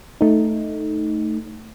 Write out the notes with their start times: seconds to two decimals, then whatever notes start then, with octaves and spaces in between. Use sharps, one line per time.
0.21 A3 D#4